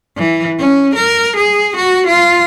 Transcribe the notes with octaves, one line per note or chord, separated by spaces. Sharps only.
E3
C#4
A#4
G#4
F#4
F4